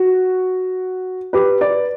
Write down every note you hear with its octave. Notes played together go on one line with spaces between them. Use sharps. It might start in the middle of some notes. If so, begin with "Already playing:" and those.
Already playing: F#4
G4 B4
B4 D5